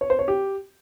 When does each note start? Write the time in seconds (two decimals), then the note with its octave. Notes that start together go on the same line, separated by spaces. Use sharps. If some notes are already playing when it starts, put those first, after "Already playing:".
0.01 C#5
0.10 C5
0.19 C#5
0.28 G4